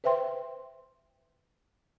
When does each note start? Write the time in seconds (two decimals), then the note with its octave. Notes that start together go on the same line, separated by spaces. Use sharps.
0.04 B4 C5 E5 G5 C6